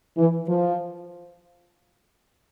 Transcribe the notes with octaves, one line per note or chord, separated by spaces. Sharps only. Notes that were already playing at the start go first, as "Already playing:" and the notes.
E3
F3